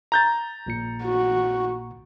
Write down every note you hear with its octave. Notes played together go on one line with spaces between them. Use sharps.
A#5 G6 A6
A#1 A#2 C#7
F#4